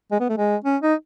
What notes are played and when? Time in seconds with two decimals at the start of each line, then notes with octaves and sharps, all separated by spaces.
0.11 G#3
0.20 B3
0.29 A3
0.38 G#3
0.64 C#4
0.82 D#4